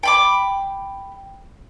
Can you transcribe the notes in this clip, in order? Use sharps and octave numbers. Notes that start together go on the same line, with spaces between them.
G5 B5 D6